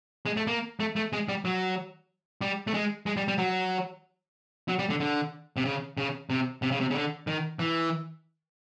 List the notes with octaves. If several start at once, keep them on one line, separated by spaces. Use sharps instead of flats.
G#3
A3
A#3
A3
A3
G#3
G3
F#3
G3
A3
G#3
G#3
G3
G3
F#3
F#3
G3
D3
D3
C3
C#3
C#3
C3
C3
C#3
C3
C#3
D3
D#3
E3